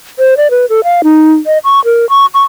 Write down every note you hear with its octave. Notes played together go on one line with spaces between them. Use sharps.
C5
D5
B4
A4
F5
D#4
D#5
C#6
A#4
C#6
C#6